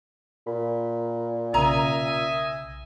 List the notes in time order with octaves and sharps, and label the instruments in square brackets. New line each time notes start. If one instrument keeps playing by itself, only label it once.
[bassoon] A#2 [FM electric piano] B5
[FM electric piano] B1 C#3 [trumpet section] D#5 E5 G#5 [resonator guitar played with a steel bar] A#5